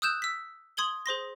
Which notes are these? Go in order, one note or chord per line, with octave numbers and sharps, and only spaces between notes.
D#6 E6 F#6 G6 E7
E6 B6
C6 D#6 G#6 F#7 G7
G#4 C5 C6 A#6